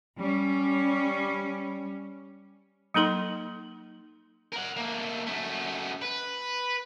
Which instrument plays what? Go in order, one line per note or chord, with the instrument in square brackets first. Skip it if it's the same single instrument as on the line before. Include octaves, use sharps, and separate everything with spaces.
[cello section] G3 C#4
[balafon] F#3 A#3 D#4 A4 C6
[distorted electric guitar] A#4 F#5
A3 A#3
F#2 A3
B4